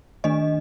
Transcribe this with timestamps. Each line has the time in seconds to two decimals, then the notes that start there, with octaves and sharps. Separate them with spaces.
0.24 D#3 A3 D4 D#5